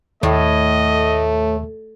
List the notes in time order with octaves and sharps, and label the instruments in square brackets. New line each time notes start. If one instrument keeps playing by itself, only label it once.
[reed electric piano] D#2 [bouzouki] A2 [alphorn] A3 [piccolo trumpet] D#5